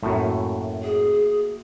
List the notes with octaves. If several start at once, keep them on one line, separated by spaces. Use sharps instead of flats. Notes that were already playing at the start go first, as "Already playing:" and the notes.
F#2 A2 A3 A#3 F#4
G#4